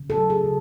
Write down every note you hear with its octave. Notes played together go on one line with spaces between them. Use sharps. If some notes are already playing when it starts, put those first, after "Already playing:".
Already playing: C#3
A4
F#3
G#4
C#3